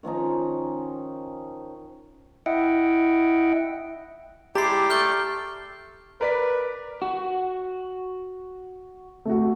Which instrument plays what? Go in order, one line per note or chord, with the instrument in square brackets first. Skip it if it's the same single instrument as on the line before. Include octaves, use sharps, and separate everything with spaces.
[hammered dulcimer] D#3 F3 C#4 D#4
[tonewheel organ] E4 D#5 E5 F#5 G5
[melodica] G#3 E4 A5 [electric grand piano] G4 [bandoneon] D5 G5 [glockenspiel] A#5 C7
[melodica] A3 A4 [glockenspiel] F6 G6 G7
[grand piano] A#4 D5 B6 [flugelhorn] B4
[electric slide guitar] F#4
[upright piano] A3 F#4